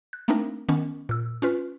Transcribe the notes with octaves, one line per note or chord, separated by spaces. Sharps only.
F#6
A3 A#3 C4 D4 D#4 A#4
D#3 B3 C#4
A#2 E6
C#4 F4 B4